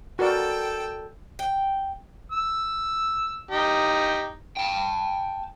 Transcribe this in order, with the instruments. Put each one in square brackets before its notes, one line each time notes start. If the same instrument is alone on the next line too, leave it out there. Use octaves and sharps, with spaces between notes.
[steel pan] F#4 A#4 D5 [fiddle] A4 G5
[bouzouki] G5
[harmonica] E6
D#4 G4
[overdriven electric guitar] G5 A5